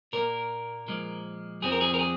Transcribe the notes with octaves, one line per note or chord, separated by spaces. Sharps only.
A#2 A#3 A#4
A#2 F3 G#3
F2 F3 C4 G#4
A#4
G#4
A#4
G#4